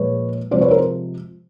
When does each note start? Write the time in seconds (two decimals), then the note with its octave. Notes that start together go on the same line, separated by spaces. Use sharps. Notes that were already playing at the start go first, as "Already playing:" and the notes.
Already playing: A#2 F3 G#3 B4 C#5
0.51 C3 F3 G#3 C5 D5
0.61 B4 C#5
0.71 A#4 C5